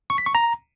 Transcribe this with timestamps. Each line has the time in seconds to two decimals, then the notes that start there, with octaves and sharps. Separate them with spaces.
0.10 C#6
0.18 B6
0.26 C#6
0.35 A#5